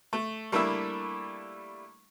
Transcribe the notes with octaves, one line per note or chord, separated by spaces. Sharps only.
A3
G3 A3 A#3 D4 E4 E5